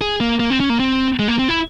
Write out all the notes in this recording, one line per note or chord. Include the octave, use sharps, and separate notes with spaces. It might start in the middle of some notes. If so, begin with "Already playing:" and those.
G#4
A#3
A#3
C4
C#4
A#3
C4
G#3
A#3
C4
E4